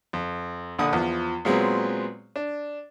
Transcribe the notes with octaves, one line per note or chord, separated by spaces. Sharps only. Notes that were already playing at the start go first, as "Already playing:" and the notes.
F2
A#1 D3 D#6
E2 F3
A#2 F#3 G#3 B3 C4
D4